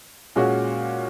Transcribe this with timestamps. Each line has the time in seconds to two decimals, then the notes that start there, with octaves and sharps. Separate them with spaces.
0.36 A#2 G#3 C#4 F#4